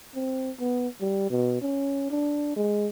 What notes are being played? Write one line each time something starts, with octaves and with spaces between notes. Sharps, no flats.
C4
B3
G3
B2
C#4
D4
G#3